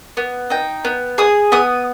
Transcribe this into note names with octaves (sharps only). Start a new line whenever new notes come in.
B3
D#4 G5
B3
G#4 D#6
B3 D#6